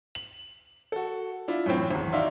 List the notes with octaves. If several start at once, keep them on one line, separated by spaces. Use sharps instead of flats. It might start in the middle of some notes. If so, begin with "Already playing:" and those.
F#7
F#4 A4
D4 E4 F4
F#2 A2 E3 C4
G#1 E2
D#4 F#4 D5 E5 F5 C6